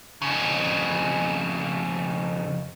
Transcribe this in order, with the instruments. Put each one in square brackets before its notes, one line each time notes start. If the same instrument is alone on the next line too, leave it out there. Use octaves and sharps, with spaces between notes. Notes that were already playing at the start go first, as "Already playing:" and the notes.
[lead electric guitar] F2 C#3